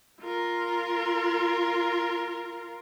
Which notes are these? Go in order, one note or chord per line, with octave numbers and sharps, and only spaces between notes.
F4 A#4